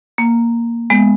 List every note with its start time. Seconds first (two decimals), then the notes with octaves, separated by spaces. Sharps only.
0.18 A#3
0.90 G#3 B3